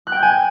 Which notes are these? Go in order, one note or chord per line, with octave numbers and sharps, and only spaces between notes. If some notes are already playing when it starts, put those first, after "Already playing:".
F#6
G5
G6
G#5